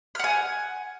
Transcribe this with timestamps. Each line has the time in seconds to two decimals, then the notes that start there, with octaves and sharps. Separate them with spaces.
0.15 F6
0.19 F#5
0.24 G#5